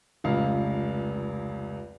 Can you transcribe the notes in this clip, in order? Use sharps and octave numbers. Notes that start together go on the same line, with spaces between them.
F1 C#2 F5